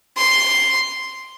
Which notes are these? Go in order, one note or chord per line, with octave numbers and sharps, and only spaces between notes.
C6